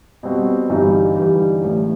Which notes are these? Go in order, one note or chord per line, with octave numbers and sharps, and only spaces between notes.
B2 G3 C4 F#4
G1 G2 E3 G3 D#4
G1 G2 E3 G3 D#4
A1 A2 G3